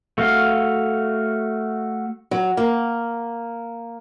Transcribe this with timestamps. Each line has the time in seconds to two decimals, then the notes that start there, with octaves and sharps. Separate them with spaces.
0.18 A3 F#4 F5
2.31 F#3
2.57 A#3